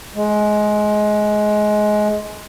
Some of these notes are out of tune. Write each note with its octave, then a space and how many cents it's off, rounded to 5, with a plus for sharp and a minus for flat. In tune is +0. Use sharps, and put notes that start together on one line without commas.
G#3 +20